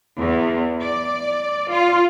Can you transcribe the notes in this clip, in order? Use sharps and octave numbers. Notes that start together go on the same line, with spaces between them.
E2
D5
F4